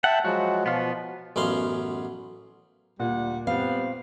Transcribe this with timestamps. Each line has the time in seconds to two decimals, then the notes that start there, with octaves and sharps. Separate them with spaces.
0.04 E5 F#5 G5 A5
0.25 F3 F#3 G#3 F#4
0.66 B2 F3 B3 F4
1.36 A1 F#2 B3 F5 C6
3.00 D2 A#2 G3 F#5
3.47 G3 B3 C4 F5